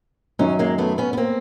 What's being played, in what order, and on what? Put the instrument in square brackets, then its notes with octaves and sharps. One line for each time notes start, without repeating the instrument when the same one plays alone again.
[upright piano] F#2 D#3 F#3 [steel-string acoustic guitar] C#4 D#4
[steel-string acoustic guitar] G#3 A#3
A3 B3
B3 C#4
B3
A#3 C4